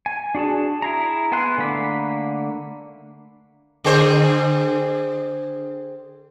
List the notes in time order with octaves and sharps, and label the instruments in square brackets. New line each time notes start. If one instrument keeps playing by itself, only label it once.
[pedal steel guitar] G#5
D4 F#4 G#4 A5
E4 G#4 A#5
B3 E4 G#5 C6 F#6
D3 A3 A#3 B5 D6
[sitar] D3 G#4 C5